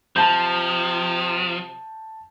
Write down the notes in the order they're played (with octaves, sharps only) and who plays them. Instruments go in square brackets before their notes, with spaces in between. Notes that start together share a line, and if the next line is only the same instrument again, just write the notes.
[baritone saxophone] C3 [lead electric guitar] F3 [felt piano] A5 G6